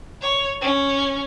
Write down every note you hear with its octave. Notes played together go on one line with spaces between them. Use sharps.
C#5
C#4